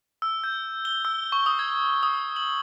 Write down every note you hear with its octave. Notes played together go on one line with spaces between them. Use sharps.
E6
G6
G7
E6
C#6
D#6
G#6
D#6
F#7